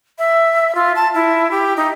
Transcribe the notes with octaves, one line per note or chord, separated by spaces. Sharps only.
E5
F4
A5
E4
G4
D#4